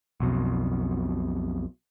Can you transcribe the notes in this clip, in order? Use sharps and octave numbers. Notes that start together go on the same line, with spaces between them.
B1 F2 B2